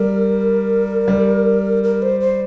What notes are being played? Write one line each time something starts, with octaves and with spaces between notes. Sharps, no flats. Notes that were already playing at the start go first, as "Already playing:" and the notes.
Already playing: G3 A#4
G3
A#4
C5
C5